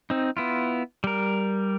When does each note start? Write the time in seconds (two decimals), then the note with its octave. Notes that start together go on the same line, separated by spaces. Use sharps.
0.10 C4 D#4
0.37 B3 E4 F4
1.04 G3 A#4